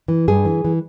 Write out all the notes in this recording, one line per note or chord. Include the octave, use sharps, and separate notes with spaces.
E3
G2 G#4
E3
E3